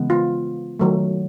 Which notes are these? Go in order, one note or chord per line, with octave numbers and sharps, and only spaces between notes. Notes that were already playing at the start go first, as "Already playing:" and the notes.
Already playing: C#3 E3 G#3 B3
F4
D#3 F#3 A3